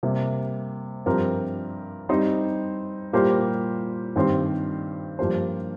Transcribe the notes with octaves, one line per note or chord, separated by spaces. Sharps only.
C3 G3 A#3
G2 F3 C4 G4 A#4
G3 C4 D#4 C5
A#2 G3 A#3 G4 C5
G2 D#3 C4 G4 C5
G2 F3 A#3 G4 C5